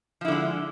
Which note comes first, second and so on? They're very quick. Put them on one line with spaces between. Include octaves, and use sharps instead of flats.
F3 E4 D3 G#3